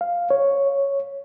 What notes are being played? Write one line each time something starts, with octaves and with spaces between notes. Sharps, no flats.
F5
C#5